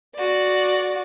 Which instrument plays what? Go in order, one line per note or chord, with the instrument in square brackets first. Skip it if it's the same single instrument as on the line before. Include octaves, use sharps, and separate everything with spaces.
[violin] F#4 D5